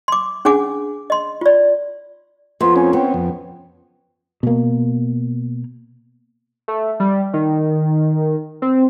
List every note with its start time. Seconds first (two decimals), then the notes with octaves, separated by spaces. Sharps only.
0.08 C6 D6
0.45 C#4 D4 G#4 F#5 G#5 D6
1.10 D#5 C6
1.41 F4 D5
2.61 F2 B3 C6
2.76 C4 C#4 G#5
2.93 B3 G5
3.14 F2
4.43 B2 A#3
6.68 A3
7.00 G3
7.34 D#3
8.62 C4